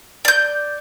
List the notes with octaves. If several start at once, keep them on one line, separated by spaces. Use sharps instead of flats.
D5 G6